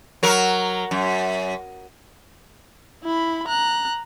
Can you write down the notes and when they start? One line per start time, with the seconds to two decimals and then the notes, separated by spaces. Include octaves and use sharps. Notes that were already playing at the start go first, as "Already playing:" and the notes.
0.23 F#3 A#4
0.91 F#2
3.04 E4 B5
3.48 A#5 F#6